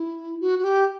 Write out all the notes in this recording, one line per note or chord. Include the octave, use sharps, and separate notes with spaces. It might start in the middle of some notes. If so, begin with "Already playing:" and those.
Already playing: E4
F#4
F#4
G4